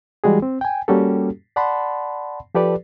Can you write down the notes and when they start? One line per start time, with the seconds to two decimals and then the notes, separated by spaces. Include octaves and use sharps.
0.24 E3 G3 G#3 F#4 G#4
0.42 C4
0.61 G5 G#5
0.88 G3 A#3 C#4 F#4 G4 A4
1.56 D5 F#5 A5 B5 C6
2.55 F3 G4 A4 B4 D5